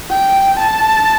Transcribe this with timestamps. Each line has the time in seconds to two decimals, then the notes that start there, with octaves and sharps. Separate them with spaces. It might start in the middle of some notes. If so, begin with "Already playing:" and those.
0.10 G5
0.59 A5